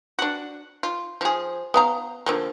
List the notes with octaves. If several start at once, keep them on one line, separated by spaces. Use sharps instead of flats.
D4 F#4
F4
F3 G#4
B3 F5 A#5
D3 F3 A#3